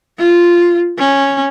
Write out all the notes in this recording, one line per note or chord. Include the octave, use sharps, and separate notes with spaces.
F4
C#4